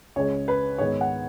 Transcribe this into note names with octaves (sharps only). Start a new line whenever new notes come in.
C#2 C#3 G#3 C#5
B4
G#2 D#3 G#3 B3 C#5
F#5